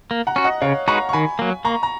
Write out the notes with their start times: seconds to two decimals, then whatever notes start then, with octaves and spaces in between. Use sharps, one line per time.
0.11 A#3
0.27 F#5 A#5
0.36 C#4 F#4
0.44 D#5 F#5
0.61 C#3 C#5 F5
0.88 G#3 D#4 F#4 B4 A#5 C#6
1.09 C#6
1.13 D#3 G#5 B5
1.39 F#3 A#3
1.65 A#3 A#5 C#6
1.83 A#5